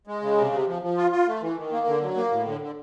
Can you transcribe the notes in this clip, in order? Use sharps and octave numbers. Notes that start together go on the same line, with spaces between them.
G#3
C#3
C3
C3
F3
F3
F4
F4
A3
E3
D#3
A#3
D3
F#3
A#3
A2
D3
D3